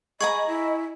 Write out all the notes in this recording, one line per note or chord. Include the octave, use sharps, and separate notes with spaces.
G#4 D#5 G#5 A#5 B5 C#6
E4